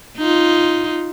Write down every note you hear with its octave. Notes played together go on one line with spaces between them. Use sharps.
D#4 F4